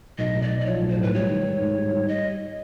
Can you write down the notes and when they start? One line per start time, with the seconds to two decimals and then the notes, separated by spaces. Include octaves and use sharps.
0.18 B1 D#5
0.35 B1
0.42 D5
0.51 B1
0.60 D5
0.66 F3 C#5
0.81 B1
0.90 C5
0.97 A2
1.02 B4
1.13 G3 C#5
1.30 D#3
1.45 G#2
1.61 G#2
1.77 G3
1.92 G3
2.08 D#5